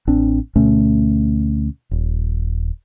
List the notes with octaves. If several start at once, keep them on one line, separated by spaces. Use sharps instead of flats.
A1 C4 D4
D2 B2 A3 C#4
D#1